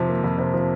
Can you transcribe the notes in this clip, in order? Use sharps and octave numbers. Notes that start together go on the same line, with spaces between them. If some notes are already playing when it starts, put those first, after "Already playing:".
Already playing: F2 C3 F3
A#3
F2
C3
F3